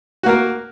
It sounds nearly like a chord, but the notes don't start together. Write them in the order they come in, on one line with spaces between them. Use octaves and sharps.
F#4 A#3 A#4